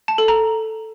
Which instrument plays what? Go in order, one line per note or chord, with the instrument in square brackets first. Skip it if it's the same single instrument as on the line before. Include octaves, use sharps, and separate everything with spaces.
[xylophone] A5
A4
A#5